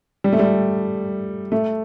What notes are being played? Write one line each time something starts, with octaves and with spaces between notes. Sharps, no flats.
G3
A3
G3
A3